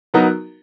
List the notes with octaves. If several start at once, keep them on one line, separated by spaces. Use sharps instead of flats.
F#3 B3 D#4 F#4 A#4